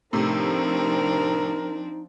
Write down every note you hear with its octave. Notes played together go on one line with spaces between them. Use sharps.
A2 C3 F3 C4 D4 D#4 A#4